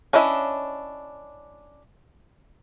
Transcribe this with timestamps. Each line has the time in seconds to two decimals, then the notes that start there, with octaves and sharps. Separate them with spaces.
0.13 C#4 D4 E4 D#5 E5